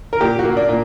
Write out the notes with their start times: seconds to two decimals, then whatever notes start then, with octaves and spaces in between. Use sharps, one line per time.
0.13 A#4
0.20 A#2 G4
0.39 F#4
0.45 A#3
0.57 D4
0.69 A#2